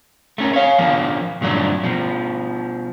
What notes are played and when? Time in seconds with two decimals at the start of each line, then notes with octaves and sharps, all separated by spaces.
0.38 A3 C#4 A#4
0.53 C#5 F5
0.78 D3 F3 A#3 B3
1.41 G2 A#2 D3 F#3 A3
1.83 B2 F3